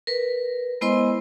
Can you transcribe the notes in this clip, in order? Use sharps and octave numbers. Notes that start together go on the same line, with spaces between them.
A#4 B4
G#3 B3 E4 C5 D#5 C6